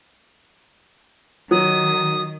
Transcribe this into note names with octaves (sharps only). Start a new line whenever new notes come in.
D#3 F#3 D#6